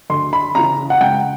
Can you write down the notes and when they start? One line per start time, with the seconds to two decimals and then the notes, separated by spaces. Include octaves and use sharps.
0.10 D2 C6
0.33 B5
0.55 C#3 E3 A#5
0.90 F#5
1.00 C#2 G5